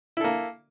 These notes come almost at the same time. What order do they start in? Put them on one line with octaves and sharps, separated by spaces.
E4 A4 A#3